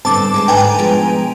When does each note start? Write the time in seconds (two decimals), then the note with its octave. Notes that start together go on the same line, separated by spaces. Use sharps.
0.05 G2 D3 C4 A5 D6
0.34 G#3 B4 C5
0.48 G#2 D3 B4 G5 G#5 A#5
0.79 B2 F3 G#3